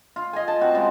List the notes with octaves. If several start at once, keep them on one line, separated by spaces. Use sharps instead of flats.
F4
D#5 G#5
A5
C4 F#4
C#3 G#3